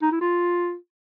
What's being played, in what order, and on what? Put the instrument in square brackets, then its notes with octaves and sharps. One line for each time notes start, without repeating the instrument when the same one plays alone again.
[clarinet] D#4
E4
F4